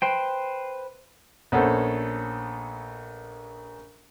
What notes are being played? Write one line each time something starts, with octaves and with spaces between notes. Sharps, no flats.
B4 C5 G5
A#1 B3 C#4 A4 C5